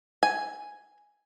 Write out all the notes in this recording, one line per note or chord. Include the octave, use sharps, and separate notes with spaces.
G#5